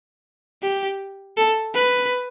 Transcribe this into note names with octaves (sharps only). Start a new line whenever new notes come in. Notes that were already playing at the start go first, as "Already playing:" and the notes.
G4
A4
B4